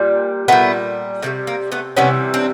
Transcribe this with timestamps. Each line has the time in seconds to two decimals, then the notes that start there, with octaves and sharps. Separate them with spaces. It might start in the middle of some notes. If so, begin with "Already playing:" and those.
Already playing: A#2 G3
0.48 A#2 G3 A3 B3
1.22 C3 E3 G3 A3
1.47 A#3
1.72 A3 B3
1.97 C3 E3 G3 B3 C#4
2.34 C4 D4